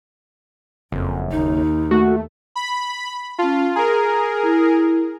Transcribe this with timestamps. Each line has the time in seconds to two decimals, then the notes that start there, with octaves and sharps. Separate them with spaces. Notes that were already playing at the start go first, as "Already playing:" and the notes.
0.92 F#1 F2
1.31 D#2 D#4
1.91 A3 F#4
2.56 B5
3.38 C#4 F4 A5
3.76 G#4 A#4 A#5
4.43 E4